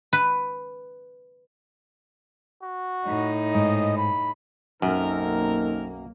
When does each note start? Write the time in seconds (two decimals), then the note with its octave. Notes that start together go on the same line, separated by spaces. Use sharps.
0.13 B4
2.63 F#4
3.06 A2 D#4
3.54 G#2 D#5
3.97 B5
4.82 B1 F#2 A#3 C4 D#4 A4 A#4